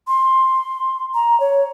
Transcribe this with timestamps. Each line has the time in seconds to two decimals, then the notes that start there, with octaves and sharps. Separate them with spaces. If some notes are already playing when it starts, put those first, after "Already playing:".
0.08 C6
1.14 A#5
1.40 C#5